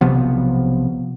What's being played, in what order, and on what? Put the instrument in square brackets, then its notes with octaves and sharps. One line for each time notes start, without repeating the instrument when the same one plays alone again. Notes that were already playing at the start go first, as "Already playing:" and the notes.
[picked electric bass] B1 C3 F3 B3